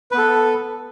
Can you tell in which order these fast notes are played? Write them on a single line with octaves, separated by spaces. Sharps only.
B4 B3 A4